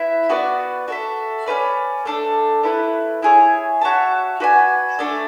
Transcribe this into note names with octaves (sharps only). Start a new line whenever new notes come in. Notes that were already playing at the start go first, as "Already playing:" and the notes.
Already playing: E4 B4 E5
B3 F#4 B4 D5
F#4 A4 E5
C#4 F#4 B4 D5
A3 D4 A4
A3 E4 B4
E4 G#4 C#5
F#4 C#5 E5 A5
F#4 B4 D5 G#5
A3 D4 A4